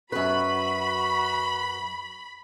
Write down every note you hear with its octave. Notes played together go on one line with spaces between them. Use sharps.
F#2 F#4 B4 B5